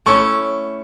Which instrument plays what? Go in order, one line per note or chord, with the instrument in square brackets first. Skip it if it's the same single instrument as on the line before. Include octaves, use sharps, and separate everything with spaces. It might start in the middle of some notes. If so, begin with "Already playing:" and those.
[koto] A3 C#4 E4 [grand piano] C#6